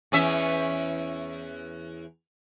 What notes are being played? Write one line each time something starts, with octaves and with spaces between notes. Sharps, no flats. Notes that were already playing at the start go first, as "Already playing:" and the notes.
E2 C#4 E5